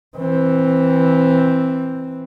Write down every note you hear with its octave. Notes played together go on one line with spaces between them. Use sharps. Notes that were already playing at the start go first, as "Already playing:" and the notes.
E3 C4